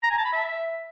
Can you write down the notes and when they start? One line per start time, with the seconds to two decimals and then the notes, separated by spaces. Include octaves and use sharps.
0.03 A#5
0.11 G#5
0.18 A5
0.25 B5
0.32 E5